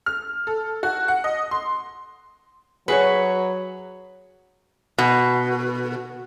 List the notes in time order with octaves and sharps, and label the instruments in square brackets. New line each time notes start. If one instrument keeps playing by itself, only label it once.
[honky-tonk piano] F6
A4
F#4
F#5
D#5
C6
[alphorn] F#3 [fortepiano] F#4 G#4 F#5 [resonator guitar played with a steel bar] B4 C#5
[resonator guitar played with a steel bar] B2